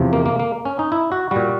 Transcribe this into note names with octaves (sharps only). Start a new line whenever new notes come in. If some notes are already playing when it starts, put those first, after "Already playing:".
Already playing: E2 C3 F3
A#3
A#3
A#3
C#4
D#4
E4
F#4
A#2 G3 F#4